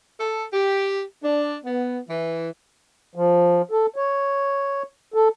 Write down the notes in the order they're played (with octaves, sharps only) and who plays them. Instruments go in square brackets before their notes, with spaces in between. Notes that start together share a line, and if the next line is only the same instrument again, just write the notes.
[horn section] A4
G4
D4
B3
E3
[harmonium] F3
A4
C#5
A4